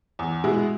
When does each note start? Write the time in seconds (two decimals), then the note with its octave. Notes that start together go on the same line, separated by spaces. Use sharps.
0.19 E2
0.44 B2 G#3 E4